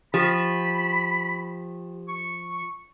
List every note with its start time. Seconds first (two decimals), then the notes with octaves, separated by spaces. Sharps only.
0.14 F3 G4 B5
2.08 C#6